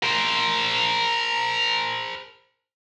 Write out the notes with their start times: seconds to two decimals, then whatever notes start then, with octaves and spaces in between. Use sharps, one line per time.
0.03 A#4 C5